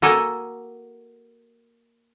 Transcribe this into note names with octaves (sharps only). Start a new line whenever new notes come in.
A#3 F#4 A4 D#5 G#5